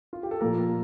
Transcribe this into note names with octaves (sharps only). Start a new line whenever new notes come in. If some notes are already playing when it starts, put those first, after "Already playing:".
F4
G4
A4
A#2 F3 A#3 A#4